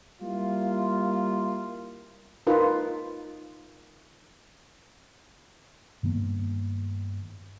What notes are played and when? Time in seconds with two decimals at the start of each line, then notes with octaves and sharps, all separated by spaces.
0.21 G3 A#3 E4 F4
2.47 D#4 F4 A#4 B4
6.03 G2 D#3 A#3 B3